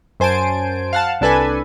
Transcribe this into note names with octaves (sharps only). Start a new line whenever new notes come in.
F#2 C5 G#5 A5 D7
F5 F#5 A5
C2 D4 A4 B4 G#5